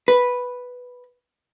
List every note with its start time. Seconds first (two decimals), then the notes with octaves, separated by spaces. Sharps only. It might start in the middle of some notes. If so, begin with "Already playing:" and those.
0.08 B4